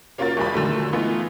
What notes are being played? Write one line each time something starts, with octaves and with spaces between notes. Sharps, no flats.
A#3 C#4 F4 F#4 A#4 A6
G1 E2 G#3 G4 D5 B5
A#2 D3 D#3 F#3 G#3 A3
E3 A3 B3 D#4 F4